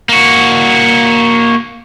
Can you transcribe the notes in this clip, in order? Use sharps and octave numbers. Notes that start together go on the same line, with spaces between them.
A#3 F#4